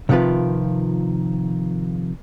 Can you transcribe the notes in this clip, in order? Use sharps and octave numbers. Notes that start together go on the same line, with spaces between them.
C3 D#3 F3 F4 B4